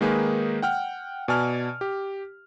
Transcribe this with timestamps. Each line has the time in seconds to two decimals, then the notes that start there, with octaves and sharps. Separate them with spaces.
0.01 D#3 G#3 A#3 D#4 G#4 B4
0.62 F#5 G5 F6
1.28 B2 D5 G#5 A5 F6
1.81 G4